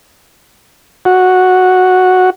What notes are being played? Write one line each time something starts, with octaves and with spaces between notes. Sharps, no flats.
F#4